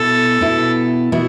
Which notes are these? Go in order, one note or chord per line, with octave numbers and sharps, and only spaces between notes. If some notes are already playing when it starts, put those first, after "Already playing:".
Already playing: B2 B3 E4 A4
B2 B3 E4
B2 B3 E4